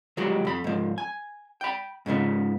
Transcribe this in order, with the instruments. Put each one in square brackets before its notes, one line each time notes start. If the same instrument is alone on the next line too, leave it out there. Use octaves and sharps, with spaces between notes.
[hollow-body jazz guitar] D#3 F3 F#3 G#3 F#4 G4
F2 B5
G#2 F3
G#5
G5 B5
G#2 C#3 F3 B3